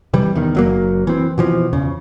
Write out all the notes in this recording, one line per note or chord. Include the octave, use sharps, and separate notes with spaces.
C3 E3 G3
E2 D#3
F#1 F#3 A#3
E3 C4
B2 E3 F3
E2 C#3